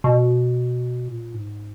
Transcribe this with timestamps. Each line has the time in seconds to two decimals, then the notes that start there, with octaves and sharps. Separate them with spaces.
0.04 B2
1.08 A#2
1.34 G#2